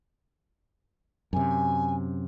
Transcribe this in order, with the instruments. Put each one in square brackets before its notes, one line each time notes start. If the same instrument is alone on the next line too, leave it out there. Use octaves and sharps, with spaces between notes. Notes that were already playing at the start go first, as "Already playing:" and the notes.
[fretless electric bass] F#2 C3 [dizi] G#5